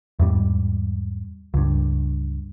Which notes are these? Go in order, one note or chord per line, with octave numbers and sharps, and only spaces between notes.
E2 G#2 G3
C#2 G2